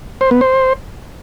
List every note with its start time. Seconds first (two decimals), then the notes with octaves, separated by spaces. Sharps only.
0.21 C5
0.31 B3
0.41 C5